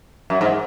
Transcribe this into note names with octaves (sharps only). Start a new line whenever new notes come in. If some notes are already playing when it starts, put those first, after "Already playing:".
F#2
G#2